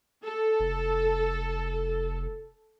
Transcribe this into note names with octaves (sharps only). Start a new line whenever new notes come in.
A4
F1